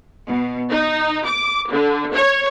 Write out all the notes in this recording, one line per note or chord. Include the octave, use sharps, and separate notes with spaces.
B2
D#4
D6
D3
C#5